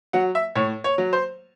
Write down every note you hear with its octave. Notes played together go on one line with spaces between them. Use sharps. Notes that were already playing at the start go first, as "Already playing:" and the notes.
F#3 F#5
E5
A2 C#5
C#5
F#3
C5